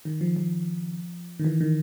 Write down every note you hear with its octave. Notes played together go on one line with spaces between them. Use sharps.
D#3
F3
F3
D#3
E3
D#3